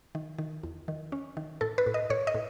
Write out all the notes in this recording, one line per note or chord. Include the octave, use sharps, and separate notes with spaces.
D#3
D#3
E2
D#3
C#4
D#3
A2 A4
B4
A2
D#5
A2 C#5
D#5
A2